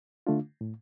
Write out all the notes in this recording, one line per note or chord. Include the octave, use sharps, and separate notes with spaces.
D3 A3 D4 F4
A2